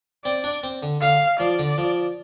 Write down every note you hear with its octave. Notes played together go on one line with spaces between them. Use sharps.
C4 D5
D4
C4
D3
D3 F5
F3 D5
D3
F3